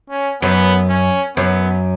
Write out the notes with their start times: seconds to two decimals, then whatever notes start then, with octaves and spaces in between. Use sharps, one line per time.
0.10 C#4
0.42 F#2 B3
0.89 C#4
1.36 F#2 B3